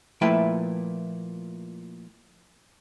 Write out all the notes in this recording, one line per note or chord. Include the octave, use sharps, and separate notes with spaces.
A#2 F3 A3 E4 B4 G5